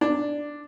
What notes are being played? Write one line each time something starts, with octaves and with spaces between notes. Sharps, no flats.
D4